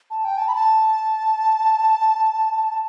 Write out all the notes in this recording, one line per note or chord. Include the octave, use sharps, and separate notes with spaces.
A5
G5
A5
B5
A5